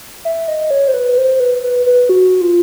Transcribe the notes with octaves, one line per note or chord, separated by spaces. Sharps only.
E5
D#5
C#5
C5
B4
C5
B4
B4
B4
F#4
F4